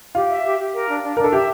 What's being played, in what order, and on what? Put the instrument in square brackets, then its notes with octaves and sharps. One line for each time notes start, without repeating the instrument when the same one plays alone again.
[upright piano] F4 [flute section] G4
[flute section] E5
G4
G4
A#4
D4
D4
[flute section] D4 [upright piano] A#4
[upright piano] A4
[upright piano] G4 [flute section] E5